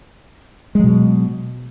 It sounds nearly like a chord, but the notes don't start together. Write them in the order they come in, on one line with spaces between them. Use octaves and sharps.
G#3 F#3 B2